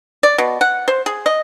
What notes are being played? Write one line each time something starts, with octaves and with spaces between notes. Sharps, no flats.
D5
B2
F#5
C5
G#4
D#5